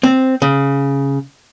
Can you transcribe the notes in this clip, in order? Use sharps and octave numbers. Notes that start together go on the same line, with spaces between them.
C4
C#3